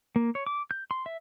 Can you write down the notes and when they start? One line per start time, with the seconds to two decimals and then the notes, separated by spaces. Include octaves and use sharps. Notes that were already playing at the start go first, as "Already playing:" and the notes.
0.16 A#3
0.35 C#5
0.47 D6
0.71 G6
0.91 C6
1.06 E5